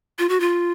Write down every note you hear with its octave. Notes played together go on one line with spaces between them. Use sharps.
F4
F#4
F4